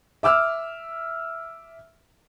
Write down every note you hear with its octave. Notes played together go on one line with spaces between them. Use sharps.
E5 D6 E6 F6